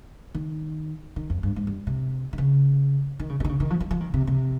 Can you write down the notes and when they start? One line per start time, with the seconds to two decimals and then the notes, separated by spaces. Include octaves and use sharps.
0.35 D#3
1.16 D#3
1.30 F2
1.43 G2
1.56 G#2
1.67 G2
1.87 C3
2.33 D#3
2.38 C#3
3.20 D#3
3.29 C#3
3.40 C3
3.45 D#3
3.49 C#3
3.60 D#3
3.70 F3
3.80 F3
3.91 F3
4.01 D#3
4.14 C3
4.27 C3